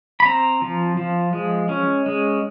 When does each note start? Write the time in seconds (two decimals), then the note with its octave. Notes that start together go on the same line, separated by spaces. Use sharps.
0.20 B5
0.25 C4 A#5
0.62 F3
0.97 F3
1.33 G#3
1.69 C#4
2.06 G#3